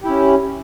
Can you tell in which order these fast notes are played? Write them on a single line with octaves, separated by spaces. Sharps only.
G4 E4 C#4